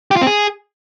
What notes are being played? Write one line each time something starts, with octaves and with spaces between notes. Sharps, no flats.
G4
F4
C4
G#4